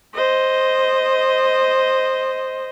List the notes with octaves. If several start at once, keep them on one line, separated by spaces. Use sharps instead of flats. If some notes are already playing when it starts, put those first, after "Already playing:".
C5 D#5